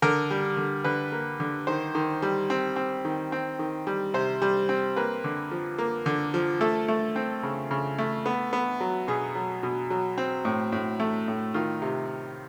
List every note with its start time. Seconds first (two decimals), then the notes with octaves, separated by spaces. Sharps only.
0.02 D3 A#4
0.31 G3
0.57 D3
0.84 D3 B4
1.12 A#3
1.40 D3
1.67 D#3 C5
1.95 D#3
2.22 G3
2.50 C4
2.76 C4
3.05 D#3
3.32 C4
3.59 D#3
3.87 G3
4.14 C3 C5
4.42 G3
4.69 C4
4.96 A#3 B4
5.24 D3
5.51 F3
5.78 A#3
6.06 D3
6.34 F3
6.61 A3 A4
6.88 A3
7.16 C4
7.43 C#3
7.71 C#3
7.98 A3
8.26 B3
8.53 B3
8.80 F#3
9.08 B2 G#4
9.35 F#3
9.63 B2
9.90 F#3
10.18 C4
10.45 A2
10.72 A2
11.00 A3
11.28 A2
11.54 D#3 F4
11.82 C3